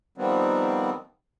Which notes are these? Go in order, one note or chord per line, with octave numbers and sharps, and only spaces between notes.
D#3 F3 G3 B3 C4